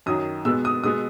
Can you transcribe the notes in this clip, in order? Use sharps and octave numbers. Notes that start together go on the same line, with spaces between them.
F#2 D#3 F#3 D#6
B2 G#3 B3 E6
D#6
B2 G#3 B3 D#6